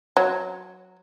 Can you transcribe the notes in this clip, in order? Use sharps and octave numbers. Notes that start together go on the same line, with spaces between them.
F#3